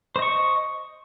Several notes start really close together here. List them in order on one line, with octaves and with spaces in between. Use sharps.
C5 D#5 C#6